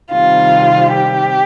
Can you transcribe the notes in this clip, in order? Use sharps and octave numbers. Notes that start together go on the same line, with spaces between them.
C3 D#3 G3 C4 F4
G4